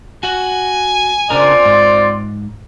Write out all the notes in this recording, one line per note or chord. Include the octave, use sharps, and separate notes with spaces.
F#4 F#5 G#5
C#3 C4 D4 F4 A#4 D5
G#2